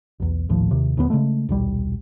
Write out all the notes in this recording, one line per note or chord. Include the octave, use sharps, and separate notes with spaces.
B1 E2
A#1 D#2 A2 F3
D#2 C3
D#1 D2 F#3 B3
C#3 E3 G#3 A3
D#1 B1 G3